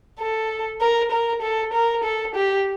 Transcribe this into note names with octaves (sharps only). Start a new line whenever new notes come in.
A4
A#4
A#4
A4
A#4
A4
G4